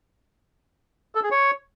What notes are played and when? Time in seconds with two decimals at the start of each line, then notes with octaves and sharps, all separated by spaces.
1.15 A4
1.23 G#4
1.31 C#5